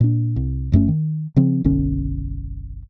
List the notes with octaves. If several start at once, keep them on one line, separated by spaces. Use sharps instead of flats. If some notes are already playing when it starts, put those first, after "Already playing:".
A#2 D4
C2
F1 F#2 A3 C#4
D#3
C#3 F3 C4
F#1 B1 D3 C#4